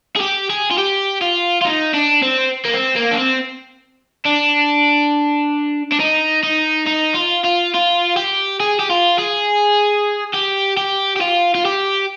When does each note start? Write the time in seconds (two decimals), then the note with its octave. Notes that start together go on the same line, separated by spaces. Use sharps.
0.16 G#4
0.20 G4
0.50 G#4
0.71 F4
0.78 G4
1.21 F4
1.61 F4
1.65 D#4
1.94 D4
2.23 C4
2.65 A#3
2.74 C4
2.96 A#3
3.11 D4
3.17 C4
4.26 D4
5.92 D4
6.00 D#4
6.43 D#4
6.87 D#4
7.15 F4
7.44 F4
7.74 F4
8.17 G4
8.60 G#4
8.79 G4
8.90 F4
9.18 G#4
10.34 G4
10.77 G4
11.17 G4
11.21 F4
11.55 F4
11.65 G4